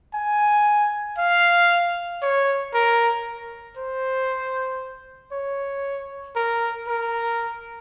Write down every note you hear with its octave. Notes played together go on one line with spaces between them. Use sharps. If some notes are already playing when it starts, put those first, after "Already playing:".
G#5
F5
C#5
A#4
C5
C#5
A#4
A#4